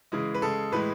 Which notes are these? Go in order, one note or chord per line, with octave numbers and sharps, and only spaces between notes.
C#3 E3 G#3
B4
C#3 G#3 A4
A2 E3 G#3 B4